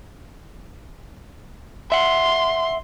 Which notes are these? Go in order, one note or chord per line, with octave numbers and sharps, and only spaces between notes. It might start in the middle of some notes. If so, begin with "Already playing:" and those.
E5 F#5 C6